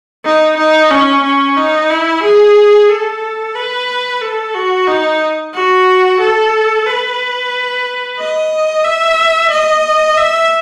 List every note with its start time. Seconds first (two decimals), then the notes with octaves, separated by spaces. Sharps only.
0.25 D#4
0.58 D#4
0.91 C#4
1.23 C#4
1.57 D#4
1.90 E4
2.23 G#4
2.89 A4
3.55 B4
4.21 A4
4.54 F#4
4.87 D#4
5.54 F#4
6.20 A4
6.87 B4
8.19 D#5
8.85 E5
9.51 D#5
10.17 E5